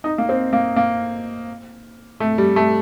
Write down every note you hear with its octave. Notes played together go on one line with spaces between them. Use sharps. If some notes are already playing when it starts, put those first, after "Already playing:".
D#4
A#3
C4
A#3
A#3
A3
G3
A3